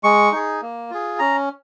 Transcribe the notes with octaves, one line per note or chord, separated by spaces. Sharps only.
G#3 C#6
D#4 G#4
A#3
F4 G#4
C#4 A#5